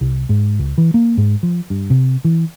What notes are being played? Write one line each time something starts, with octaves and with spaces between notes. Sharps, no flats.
C2
G#2
C#2
E3
A#3
G#2
F3
G2
C3
E3